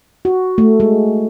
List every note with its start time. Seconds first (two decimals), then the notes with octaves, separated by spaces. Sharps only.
0.25 F#4
0.58 A3
0.80 G#3